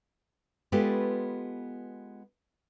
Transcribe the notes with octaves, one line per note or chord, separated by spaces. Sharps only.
G#3 B3 F4 G4 A4 B4